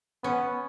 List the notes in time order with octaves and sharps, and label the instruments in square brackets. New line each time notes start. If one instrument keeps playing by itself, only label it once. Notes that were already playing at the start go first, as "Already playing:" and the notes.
[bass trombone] B3 [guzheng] C#4